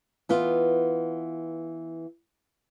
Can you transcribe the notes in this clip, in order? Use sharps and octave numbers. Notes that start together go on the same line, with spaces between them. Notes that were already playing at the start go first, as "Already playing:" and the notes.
E3 B3 F4